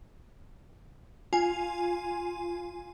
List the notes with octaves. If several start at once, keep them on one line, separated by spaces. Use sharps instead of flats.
F4 G#5